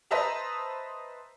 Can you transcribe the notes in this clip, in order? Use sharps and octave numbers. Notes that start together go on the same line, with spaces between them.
B4 C5 D#5 E5 A5 A#5